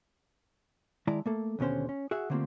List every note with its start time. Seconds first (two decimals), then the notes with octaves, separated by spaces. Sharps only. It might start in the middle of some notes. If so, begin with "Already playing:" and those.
1.07 D#3 G#3 E4 D5 A5 A#5
1.26 A3 A#3 A4
1.59 D#2 B2 D3 C#4 C5
1.89 C#4
2.11 F#4 G#4 E5 F#5
2.30 D3 A3 A#3 C4 F4 G4